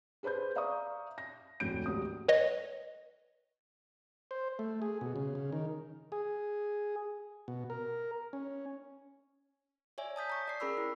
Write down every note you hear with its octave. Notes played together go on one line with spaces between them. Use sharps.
G#4 B4 C5 B5 G6
D5 E5 F5 A#5 C#6 D#6
A#6
F1 D2 A2 G6 D7
G#1 D#2 G#2 F#4 D#6
B4 C#5 D#5
C5
A3
G#4
B2
C#3
C#3
D#3
G#4
B2
A#4
C#4
C#5 D5 E5 G#5
A5 D#6 G6 B6
A#5 C#6
D5 C7
C#4 G#4 A#4 B5 C#6 E6
E4